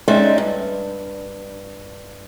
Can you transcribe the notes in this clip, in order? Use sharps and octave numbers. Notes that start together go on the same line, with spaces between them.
G#3 C4 C#4 D#4 D5 E5
G2